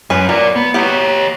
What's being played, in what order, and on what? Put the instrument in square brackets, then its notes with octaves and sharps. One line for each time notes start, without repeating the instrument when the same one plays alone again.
[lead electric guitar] F#2 [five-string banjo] C#4 B4
[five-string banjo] F#3 [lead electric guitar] A#4 D5
[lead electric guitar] B3
[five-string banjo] F#3 B3 F#5 [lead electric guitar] G4 C#5